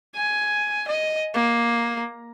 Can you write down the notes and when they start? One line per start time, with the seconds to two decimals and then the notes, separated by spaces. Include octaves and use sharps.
0.15 G#5
0.88 D#5
1.34 A#3